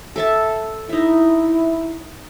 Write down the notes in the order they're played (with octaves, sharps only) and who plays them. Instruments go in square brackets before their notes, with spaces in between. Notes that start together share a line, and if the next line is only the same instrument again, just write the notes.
[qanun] A4 E5 A5
[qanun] D#4 E5 [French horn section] E4